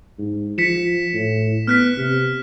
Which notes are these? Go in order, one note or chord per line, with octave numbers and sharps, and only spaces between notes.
G#2
F3 B6 C#7 E7
A2
B3 F6 F#6 B6
C3